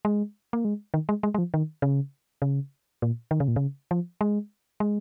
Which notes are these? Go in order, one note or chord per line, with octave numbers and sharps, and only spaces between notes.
G#3
A#3
G#3
D#3
G#3
G#3
G#3
F3
D#3
C#3
C#3
A#2
D#3
C#3
A#2
C#3
F3
G#3
G#3